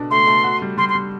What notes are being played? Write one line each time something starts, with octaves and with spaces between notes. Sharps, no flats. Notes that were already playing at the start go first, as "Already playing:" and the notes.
Already playing: B2 D4 A4
A3 C6
A3
F#4
G3
G3 C6
C6
G3